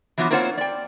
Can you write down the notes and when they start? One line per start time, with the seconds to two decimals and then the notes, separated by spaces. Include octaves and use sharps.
0.18 E3 F#3 B3 F4
0.31 A#3 C4 F4 C5 C#5 F#5
0.58 D5 G5